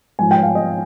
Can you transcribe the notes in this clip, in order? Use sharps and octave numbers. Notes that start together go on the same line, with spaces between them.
G#2 F3 G#5
G5
F5
D#5